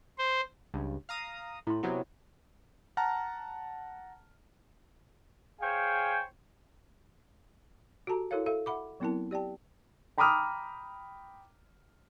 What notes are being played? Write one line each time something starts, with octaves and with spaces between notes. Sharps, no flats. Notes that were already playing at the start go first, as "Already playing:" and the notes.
C5
C#2 G2
F5 A#5 D#6
A2 E4 C6
C3 F#3 B3
F#5 A5 A#5 F6
G#4 C5 C#5 F5 G5 G#5
F#4 G4 A4 A5 A#5
E4 F#4 A4 A#4 C#5 F5
A4 E5 F5
E5 F#5 B5 D6
F#3 B3 C4 E4 A#4 A5
G4 D5 G5 A5
G5 A#5 B5 D6 D#6 F6